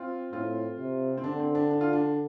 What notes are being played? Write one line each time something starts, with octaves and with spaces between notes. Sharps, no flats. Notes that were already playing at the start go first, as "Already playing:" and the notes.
Already playing: C4 F4
A2 C4 F4
C3
C4
D3 D4
C4
D4
D4
F4
D4